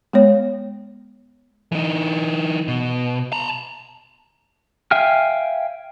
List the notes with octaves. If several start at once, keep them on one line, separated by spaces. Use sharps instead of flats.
G#3 B3 C#5
E3 D#4
B2
A5 A#5
E5 F5 G5 G#5 F6